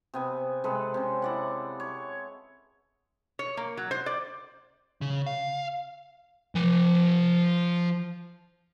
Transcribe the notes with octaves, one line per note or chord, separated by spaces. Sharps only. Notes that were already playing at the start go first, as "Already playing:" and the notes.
C3 B3 G#5
C3 G#3 A4 B4
C3 C#4
E4 D5 F#5
C#5
C#5
A#3
F#3
C5
D5
C#3
F5
F3 G#5